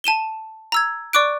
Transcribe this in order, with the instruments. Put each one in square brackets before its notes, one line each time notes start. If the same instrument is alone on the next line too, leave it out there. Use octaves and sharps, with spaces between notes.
[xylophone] A5 D#7 E7 G7
A#5 E6 G#6
D5 C#6 D6 F#6 D7